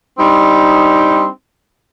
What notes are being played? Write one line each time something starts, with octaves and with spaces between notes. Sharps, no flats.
G3 C4 D4 D#4